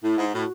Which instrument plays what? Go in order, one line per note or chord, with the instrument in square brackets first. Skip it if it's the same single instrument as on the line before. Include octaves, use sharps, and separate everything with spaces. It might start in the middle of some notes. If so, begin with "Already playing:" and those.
[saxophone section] A2 [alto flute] E4
[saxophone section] G#2
[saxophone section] A2 [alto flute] F#4